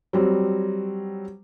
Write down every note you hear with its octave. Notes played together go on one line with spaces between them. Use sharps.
F#3 G3 C4